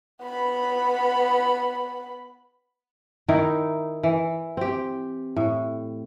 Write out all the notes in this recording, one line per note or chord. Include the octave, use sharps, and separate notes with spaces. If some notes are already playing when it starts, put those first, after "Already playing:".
B3 B5
D#3 D#4 E4 A#4
E3
C4 G4
A2